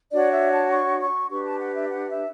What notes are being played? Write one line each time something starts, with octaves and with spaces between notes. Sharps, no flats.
D4 F#4 C#5 D5
E5
A5
C#6
C#6
D4 G4 B4 C#6
A5
F#5
E5
F#5
E5